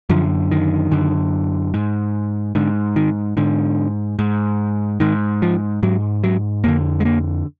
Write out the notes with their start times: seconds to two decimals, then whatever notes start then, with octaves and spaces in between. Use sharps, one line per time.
0.10 F#2 D3 F3
0.51 D#3
0.91 F#2 D3
1.74 G#2
2.55 G#2 D3
2.96 D#3
3.37 G#2 D3
4.19 G#2
5.00 G#2 D#3
5.42 F3
5.83 G#2 F#3
6.24 F#3
6.64 F2 D3 A#3
7.00 G#3
7.05 A#3